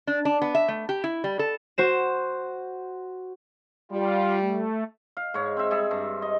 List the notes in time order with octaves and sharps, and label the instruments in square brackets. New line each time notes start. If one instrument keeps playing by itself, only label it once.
[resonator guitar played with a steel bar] D4
D4
B3
E5
A3
G4
E4
G3
A4
[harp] F#4 C5 E7
[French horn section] G3 [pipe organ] F4
[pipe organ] A3
[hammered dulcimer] F5
G#2 C#5
C4 E5
G3 G#4 E5
G2
D#5